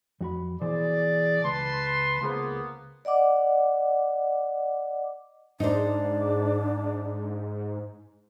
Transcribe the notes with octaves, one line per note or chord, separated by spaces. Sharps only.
F2 F#4 B5
B2 E3 G#4 C5 D5
C#2 B4 A5 C6
C#2 A#3 B3 G#4 C5
D5 D#5 F#5 D6
G#2 D4 D#4 C5